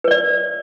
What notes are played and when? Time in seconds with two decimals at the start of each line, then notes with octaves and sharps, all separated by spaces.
0.04 B4
0.08 C#5
0.11 D5